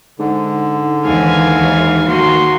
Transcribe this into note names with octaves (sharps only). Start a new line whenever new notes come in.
G#2 D3
D#2 G#2 E3 F5 G#5
D#3 A#3 F#4 C6